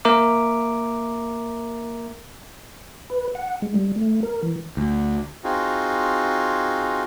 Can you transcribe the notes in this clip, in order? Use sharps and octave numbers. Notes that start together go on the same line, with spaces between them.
A#3 A#4 E5 A#5 D6
B4
F#5
G#3
G3
A3
A#4
E3
D2
C4 D#4 F4 F#4 G#4